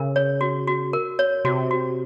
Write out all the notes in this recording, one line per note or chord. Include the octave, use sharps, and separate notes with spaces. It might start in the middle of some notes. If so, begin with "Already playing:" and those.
Already playing: C#3 A#4
C#5
F#4
F#4
A#4
C#5
C3 F#4
F#4